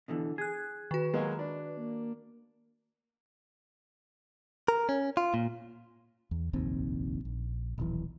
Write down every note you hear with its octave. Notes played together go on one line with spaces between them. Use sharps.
B2 D3 E3
G#4 F#6 G#6
D#3 F#4 B4
F#3 G#3 A#3
D4
A#3
A#4
C#4
F4
A#2
E2
F1 A#1 D#2 C4
A#1
D#1 B1 E3